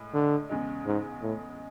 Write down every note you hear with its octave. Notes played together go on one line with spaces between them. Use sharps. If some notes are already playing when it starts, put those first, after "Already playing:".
Already playing: A2 G#3
D3
E2 C#3 G#3
G#2
A2